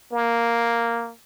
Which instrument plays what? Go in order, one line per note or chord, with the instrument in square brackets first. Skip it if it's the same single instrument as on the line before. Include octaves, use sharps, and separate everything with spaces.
[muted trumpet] A#3